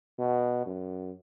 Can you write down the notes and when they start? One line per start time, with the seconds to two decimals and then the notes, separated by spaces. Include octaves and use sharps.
0.19 B2
0.66 F#2